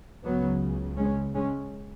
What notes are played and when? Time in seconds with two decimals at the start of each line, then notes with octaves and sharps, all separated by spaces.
0.23 C#2 C#3 F#3 B3
0.97 G#3 C#4
1.34 G#3 C#4